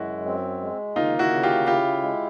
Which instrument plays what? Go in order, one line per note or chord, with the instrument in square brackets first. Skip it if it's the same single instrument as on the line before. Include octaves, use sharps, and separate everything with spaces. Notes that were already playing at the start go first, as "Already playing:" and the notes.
Already playing: [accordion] F#2 G#3 [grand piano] E4 F#4
[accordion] C4
G#3
[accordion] A#3 [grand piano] D#4 F4
[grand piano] E4 F#4
[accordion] C#3
[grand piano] F4 G4
[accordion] E4 [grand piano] F4 G4
[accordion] G#3